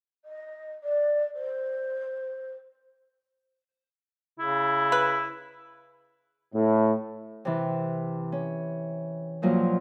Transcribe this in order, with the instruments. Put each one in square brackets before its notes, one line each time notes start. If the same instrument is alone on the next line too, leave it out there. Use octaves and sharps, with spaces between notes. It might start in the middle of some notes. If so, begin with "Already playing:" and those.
[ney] D#5
D5
C5
[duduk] C#3 [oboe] E4
[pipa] B4
[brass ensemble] A2
[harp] C3 E3
C#4
G2 A#2 F3 F#3